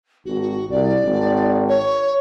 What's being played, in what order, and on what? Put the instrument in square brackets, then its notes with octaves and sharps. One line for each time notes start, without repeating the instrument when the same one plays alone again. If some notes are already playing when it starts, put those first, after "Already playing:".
[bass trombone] G#1 [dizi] F#4
[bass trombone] C2 [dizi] D5
[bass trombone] G#1
[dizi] C#5